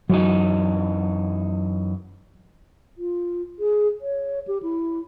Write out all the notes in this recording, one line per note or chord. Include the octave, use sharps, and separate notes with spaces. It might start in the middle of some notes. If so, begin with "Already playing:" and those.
F#2 E3 F#3 D#4
F4
G#4
C#5
G4
E4